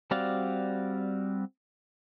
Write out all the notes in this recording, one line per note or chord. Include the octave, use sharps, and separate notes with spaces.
G3 C4 F#4 D5 F5